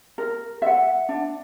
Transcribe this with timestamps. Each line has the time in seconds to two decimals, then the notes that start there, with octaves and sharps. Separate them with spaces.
0.18 A#4
0.62 E5 F#5
1.09 D4